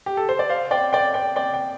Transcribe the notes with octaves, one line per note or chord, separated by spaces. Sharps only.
G4
A4
C5
D5
C5 F5
D5 G5
D5 G5
D5 G5
D5 G5
G5